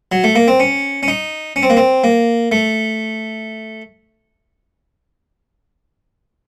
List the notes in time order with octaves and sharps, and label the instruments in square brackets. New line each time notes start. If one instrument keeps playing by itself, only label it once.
[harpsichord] F#3
A3
A#3
C4
C#4
C#4
D#4
C#4
C4
A#3
C4
A#3
A3